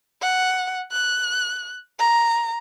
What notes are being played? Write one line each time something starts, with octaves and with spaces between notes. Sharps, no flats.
F#5
F#6
A#5